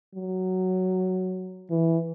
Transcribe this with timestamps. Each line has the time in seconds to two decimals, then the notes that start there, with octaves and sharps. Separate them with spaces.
0.15 F#3
1.70 E3